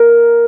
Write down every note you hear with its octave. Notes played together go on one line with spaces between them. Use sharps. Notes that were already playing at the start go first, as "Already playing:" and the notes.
Already playing: A#4